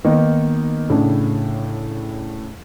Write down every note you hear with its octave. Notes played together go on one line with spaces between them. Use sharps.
D#3 A#3 B3 D#4
A2 C#3 D4